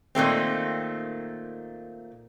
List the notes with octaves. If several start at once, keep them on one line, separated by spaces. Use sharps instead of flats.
A#2 D#3 A3 C4